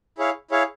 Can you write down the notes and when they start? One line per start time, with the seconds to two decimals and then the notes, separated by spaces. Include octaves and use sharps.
0.18 E4 G#4 C#5 F5
0.51 E4 G#4 C#5 F5